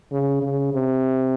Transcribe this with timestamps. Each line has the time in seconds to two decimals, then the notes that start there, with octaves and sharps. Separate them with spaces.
0.12 C#3
0.43 C#3
0.74 C3